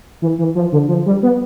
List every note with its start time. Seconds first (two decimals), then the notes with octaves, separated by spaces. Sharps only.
0.22 E3
0.39 E3
0.55 F3
0.72 D3
0.88 F3
1.06 G3
1.23 B3